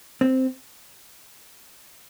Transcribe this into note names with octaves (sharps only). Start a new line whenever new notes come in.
C4